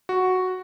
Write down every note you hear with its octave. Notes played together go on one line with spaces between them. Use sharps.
F#4